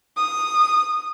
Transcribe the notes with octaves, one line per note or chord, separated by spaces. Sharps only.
D#6